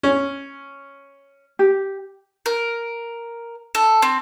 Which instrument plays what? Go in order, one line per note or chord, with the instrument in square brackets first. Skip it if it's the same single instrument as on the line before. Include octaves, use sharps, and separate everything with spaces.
[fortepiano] C#4
[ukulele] G4
[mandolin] A#4
A4
C4